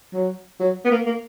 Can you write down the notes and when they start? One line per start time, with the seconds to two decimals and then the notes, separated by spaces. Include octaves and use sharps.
0.13 F#3
0.59 F#3
0.85 B3
0.91 A#3
1.06 A#3